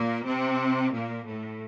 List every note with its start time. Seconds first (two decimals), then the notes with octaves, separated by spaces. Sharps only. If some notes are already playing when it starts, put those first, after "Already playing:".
Already playing: A#2 A#3
0.24 C3 C4
0.92 A#2 A#3
1.26 A2 A3